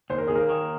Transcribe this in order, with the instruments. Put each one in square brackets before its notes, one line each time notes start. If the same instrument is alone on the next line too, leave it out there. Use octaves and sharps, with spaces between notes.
[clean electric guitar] D#2 [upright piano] C5
[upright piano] A#4
[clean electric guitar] D#2 [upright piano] G#4
[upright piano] A#3 A#4
[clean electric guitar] D#3